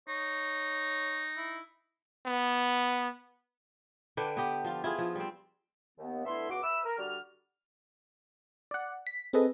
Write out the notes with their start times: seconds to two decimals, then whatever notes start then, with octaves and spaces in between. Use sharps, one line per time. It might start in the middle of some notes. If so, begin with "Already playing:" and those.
0.08 D#4 C#5
1.37 E4
2.26 B3
4.17 D3 D4 B4 G5
4.37 B3 G4
4.64 F3 F4
4.84 E4 F4 G#4
4.98 F3
5.15 G3 C4
5.98 D#2 B3
6.25 D3 A3 B3 E4 E5 C6
6.50 C#2 B3 F#4 D6
6.63 B4 E5 E6
6.84 A#4
6.98 D3 G3 F#4 F6
8.71 D5 F#5
9.07 B6
9.33 C4 G#4 A4 B4 D#5